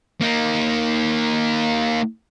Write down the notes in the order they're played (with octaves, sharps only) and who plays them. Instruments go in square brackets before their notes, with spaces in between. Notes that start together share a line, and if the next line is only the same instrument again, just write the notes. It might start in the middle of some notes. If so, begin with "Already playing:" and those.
[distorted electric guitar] A#3 D#4